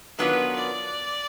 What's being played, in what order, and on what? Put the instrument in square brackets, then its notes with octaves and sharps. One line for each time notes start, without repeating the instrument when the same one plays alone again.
[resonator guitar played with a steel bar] D#3 F#3 B3 D4 F4 [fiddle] B4
[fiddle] D5